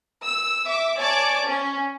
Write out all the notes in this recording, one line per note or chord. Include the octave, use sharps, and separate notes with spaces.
E6
E5 D6
C#5 D5 G#5 A5 D6
C#4